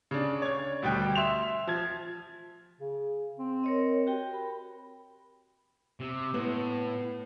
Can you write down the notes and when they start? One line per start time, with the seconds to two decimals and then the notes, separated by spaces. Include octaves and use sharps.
0.11 C#3 D4
0.42 C#5 G#6
0.82 D2 B2 G3 G5 F#6
1.15 E5 C6 E7 F7
1.67 F3 G#6
2.80 C#3
3.39 C4
3.64 A#4 C#5 D#5
4.07 F#4 G4 G5
4.31 A#4 B5
6.00 C3
6.34 A2 B3